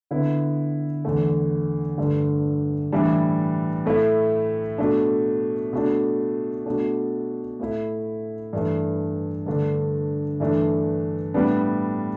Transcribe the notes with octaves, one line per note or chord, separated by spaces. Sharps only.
D3 B3 E4
E2 D3 A3
G2 D3 A3
A2 E3 G3 D4
A2 A3 E4
B2 A3 D4
B2 A3 D4
B2 A3 D4
A2 A3 E4
G2 E3 A3 D4
G2 D3 A3 D4
G2 E3 A3 D4
A2 G3 B3 D4